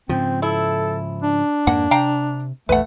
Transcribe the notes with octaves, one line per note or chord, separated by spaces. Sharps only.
G#2 C#3 F3 C4
E4 A4
D4
F2 G#2 A#3 F#5
C3 F5 G5 A#5
A#1 E2 A3 B4 F#5